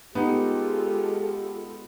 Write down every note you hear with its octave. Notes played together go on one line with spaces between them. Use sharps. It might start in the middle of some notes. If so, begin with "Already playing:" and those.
G#3 B3 D#4 F4 G4 A4